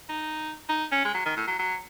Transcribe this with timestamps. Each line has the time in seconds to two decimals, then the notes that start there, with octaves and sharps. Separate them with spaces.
0.09 D#4
0.69 D#4
0.92 C#4
1.05 G#3
1.14 F#3
1.26 D#3
1.37 A2
1.47 F#3
1.59 F#3